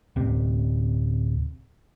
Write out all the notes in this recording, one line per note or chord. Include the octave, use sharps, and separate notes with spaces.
D1 C3